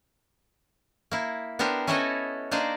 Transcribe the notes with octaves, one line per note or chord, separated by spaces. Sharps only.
A#3 E4
B3 D4 G4 A#4 C5
C#4 E4 F#4 A4 C#5 D#5
A#3 D4 D#4 C5 D5